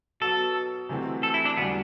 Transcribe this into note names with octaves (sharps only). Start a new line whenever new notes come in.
B2 F#3 B3 A4
C3 E3 A3 C4 F#4
A4
E4
D4
E2 B2 G3 B3 D4 F#4